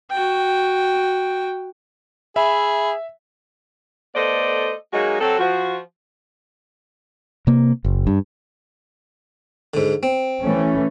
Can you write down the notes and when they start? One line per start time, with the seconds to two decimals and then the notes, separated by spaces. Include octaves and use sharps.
0.10 F#4 G5
2.36 G#4 E5 B5
4.15 A3 B3 A4 C5 D5 D#5
4.93 F#3 G#3 A#3 D#4 F#4 G#4
5.21 F#3 C4 F#4 A4
5.39 F3 F#4
7.47 C3 A#3
7.85 F#1
8.07 G2
9.74 G#2 D3
10.03 C4
10.43 E3 A3 C#4